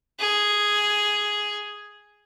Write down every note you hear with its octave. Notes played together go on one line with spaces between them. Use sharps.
G#4